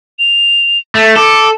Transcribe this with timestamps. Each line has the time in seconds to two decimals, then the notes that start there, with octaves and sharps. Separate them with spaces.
0.19 F7
0.95 A3
1.16 A4 D6